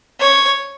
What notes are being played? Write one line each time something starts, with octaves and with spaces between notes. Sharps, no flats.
C#5